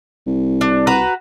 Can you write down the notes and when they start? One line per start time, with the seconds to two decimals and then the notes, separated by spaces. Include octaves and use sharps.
0.27 C2
0.61 D4
0.87 F#4 B4 A#5